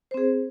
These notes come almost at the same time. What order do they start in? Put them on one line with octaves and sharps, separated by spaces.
C5 C4 G#4